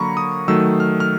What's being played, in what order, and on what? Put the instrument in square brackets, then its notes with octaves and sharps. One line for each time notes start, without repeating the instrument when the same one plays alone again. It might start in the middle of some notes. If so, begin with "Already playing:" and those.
Already playing: [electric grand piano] D3 F#3 A#3 A#5 B5 C#6
D#6
D#3 F#3 A3 E6
F6
F6